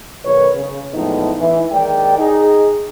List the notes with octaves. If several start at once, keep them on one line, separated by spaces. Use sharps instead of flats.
B1 D#3 B4 C#5
C#3
E2 A2 F3 G#3 B3 D#4
E3
D#2 G#3 A#4 D5 G5
D#4 G#4